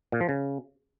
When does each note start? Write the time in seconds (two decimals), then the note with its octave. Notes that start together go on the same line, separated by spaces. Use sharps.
0.12 A#2
0.21 F3
0.29 C#3